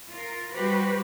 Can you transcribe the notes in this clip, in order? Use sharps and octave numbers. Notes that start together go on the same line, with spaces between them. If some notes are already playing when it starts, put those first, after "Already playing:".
F4 A#4
G3 F#4 G4 B4 C5